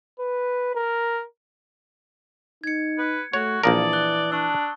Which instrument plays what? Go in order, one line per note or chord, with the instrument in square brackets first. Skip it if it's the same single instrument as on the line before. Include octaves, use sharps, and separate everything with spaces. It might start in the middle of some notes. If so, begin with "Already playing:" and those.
[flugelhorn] B4
A#4
[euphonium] D#4 [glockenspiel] G#6 C#7
[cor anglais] B4
[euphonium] A3 [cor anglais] F#4 [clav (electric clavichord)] C#5
[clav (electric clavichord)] A#1 A#2 A#4 [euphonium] E3 [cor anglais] D5 [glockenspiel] A5 D#6 A6
[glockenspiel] F#6 G7
[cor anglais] D4 [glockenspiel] A5 C#6 E6